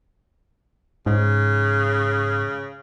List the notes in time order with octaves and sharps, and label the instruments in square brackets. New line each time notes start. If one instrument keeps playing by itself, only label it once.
[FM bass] G#2 [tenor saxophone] C#3